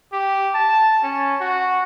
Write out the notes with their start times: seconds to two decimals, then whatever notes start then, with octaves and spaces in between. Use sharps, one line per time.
0.13 G4
0.55 A5
1.03 C#4
1.41 F#4